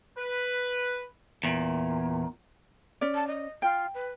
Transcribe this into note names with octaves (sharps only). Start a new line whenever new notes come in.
B4
E2 A#2
C#4 D5
A5
D#5
F4 G5
B4